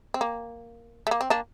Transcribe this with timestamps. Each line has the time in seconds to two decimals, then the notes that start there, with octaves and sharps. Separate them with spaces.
0.14 C4
0.21 A#3
1.07 A3
1.11 A#3
1.21 C4
1.30 A#3 D4